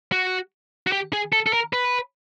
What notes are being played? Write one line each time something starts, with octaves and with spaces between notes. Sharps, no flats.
F#4
F#4
G4
G#4
A4
A4
A#4
B4